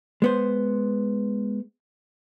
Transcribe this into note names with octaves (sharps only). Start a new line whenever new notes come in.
G#3 B3 C5